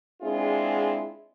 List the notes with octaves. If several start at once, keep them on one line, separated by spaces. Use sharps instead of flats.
G#3 C4 D4 E4 F4 G#4